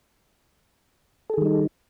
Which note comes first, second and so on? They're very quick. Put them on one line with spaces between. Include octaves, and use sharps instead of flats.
A4 G#4 D#3 G3 D#4